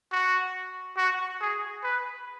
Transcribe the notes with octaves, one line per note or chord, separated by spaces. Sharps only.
F#4
F#4
G#4
B4